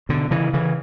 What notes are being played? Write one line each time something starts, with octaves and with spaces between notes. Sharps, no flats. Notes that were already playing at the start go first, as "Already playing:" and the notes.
B2 D3
C#3 E3
C#3 E3